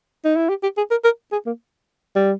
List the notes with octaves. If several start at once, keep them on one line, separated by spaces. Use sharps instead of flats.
D#4
E4
G4
G4
G#4
A#4
A#4
G#4
A#3
G3